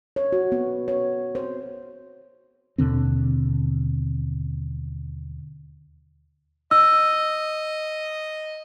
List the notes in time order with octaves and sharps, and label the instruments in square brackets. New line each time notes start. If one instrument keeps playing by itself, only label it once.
[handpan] C#5
F#4
B3
C#5
C5
[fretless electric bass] D#2 B2 D3 C4
[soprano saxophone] D#5 [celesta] E6